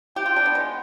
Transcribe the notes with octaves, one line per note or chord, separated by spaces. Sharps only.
G4 G5
F4
D4
B3
G#3